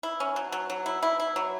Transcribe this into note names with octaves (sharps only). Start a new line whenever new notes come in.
E4
C#4
F#3
F#3
F#3
E4
E4
E4
F#3